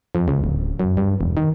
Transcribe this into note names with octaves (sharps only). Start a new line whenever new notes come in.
F2
C#2
D1
F#2
G2
E1
D#3